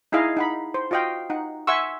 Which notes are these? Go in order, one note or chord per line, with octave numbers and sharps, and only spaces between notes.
D#4 E4 G#4 D#5 F5
D#4 F#5 B5
C5
F4 F#4 D#5 F5 G5
D#4 F#5
E5 F#5 G#5 C6 C#6 E6